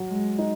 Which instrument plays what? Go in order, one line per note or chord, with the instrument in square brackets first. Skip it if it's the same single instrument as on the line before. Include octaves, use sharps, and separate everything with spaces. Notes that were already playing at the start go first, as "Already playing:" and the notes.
Already playing: [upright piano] F#3
[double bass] G#3
[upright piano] D#4